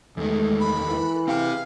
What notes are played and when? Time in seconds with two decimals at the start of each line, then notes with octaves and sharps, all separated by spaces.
0.17 E2 D#3 G#3 A3
0.60 A4 A#4 B5 F#6
0.89 E3
1.28 C4 G4 G#4 F5 G5